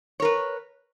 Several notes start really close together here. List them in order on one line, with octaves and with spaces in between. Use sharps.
C#5 A#4 B4